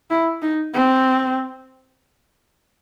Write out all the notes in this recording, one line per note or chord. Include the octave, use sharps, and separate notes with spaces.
E4
D#4
C4